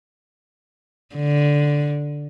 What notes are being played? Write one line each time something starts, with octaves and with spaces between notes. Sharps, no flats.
D3